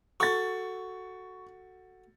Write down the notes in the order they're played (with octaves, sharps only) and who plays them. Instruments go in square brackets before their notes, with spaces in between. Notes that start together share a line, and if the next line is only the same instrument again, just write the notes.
[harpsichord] F#4 A4 [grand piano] C#6 A6